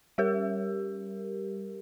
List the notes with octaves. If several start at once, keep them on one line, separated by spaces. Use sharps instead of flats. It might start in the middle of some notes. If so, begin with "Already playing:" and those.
G3 G4 A#4